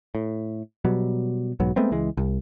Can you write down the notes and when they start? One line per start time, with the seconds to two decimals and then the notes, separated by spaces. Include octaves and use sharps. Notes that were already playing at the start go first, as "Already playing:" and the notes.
0.15 A2
0.85 B2 F#3 G3
1.60 B1 G#2 F#3 B3
1.76 G#3 A3 B3 C4
1.91 C#2 E3 G#3
2.17 C2